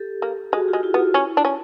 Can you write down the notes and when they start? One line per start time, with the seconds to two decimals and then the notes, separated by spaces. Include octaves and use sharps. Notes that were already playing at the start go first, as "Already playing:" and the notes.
Already playing: G4 A4
0.22 A#3
0.52 G#3 F#4 G#4
0.68 F4 G4
0.73 G#3
0.83 E4 F#4
0.94 B3
0.99 F4
1.14 C#4 E4
1.37 D4
1.45 C#4